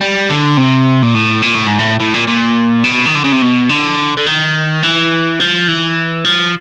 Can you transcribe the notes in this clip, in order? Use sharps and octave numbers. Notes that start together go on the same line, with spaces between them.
G3
D3
C3
A#2
A2
A#2
A2
G#2
A2
A2
A#2
A#2
B2
D#3
D3
C#3
C3
B2
D3
D3
D#3
E3
F3
E3
F3